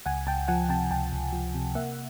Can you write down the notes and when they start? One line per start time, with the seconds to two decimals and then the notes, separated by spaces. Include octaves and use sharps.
0.06 C#2 F#5 G#5
0.27 C#2 G5 A5
0.48 F3 F#5 G#5
0.69 C3 G5 A5
0.91 C#2 G5 A5
1.12 C#2
1.33 F3
1.55 C3
1.75 A#3 E5 F#5